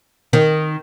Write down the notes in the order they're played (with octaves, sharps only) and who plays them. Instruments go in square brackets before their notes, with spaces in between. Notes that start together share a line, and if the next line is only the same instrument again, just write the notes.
[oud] D#3